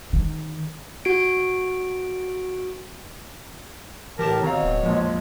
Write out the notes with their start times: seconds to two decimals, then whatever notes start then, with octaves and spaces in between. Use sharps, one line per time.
0.13 D#3
1.05 F#4 D7
4.19 A2 E3 G4 A#4 A5 D6 E7
4.43 B2 D#3 C4 C#5 F5 A#5
4.63 D1
4.83 A#1 F2 A#2 F3 G#3